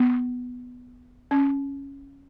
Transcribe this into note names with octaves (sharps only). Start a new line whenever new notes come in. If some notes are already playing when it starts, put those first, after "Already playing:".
Already playing: B3
C#4